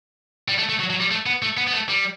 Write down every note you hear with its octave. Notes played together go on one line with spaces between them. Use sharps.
G3
A3
A3
F#3
F#3
G3
A3
B3
A3
B3
B3
A3
G3